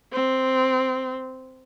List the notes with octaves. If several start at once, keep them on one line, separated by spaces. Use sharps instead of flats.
C4